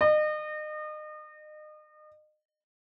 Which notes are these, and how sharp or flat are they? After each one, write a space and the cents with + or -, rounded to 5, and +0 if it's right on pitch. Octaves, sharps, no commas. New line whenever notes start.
D#5 -35